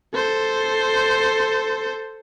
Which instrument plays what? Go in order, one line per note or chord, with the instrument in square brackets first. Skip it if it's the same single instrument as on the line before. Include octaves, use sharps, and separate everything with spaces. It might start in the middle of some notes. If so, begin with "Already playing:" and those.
[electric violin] A4 C5